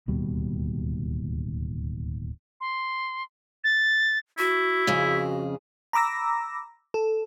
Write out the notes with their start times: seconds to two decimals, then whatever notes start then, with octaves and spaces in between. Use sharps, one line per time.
0.08 D1 D#2 B2 G3
2.61 C6
3.64 A6
4.38 E4 F#4
4.87 F2 C#3 G#4
5.93 A#5 B5 D6 E6 A#6
6.94 A4